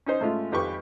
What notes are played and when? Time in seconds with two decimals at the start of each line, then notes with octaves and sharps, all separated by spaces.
0.06 C#4 D#4 C5
0.20 A2 G#3 A3 C#4 F4
0.52 G#1 F2 G4 B4 C#6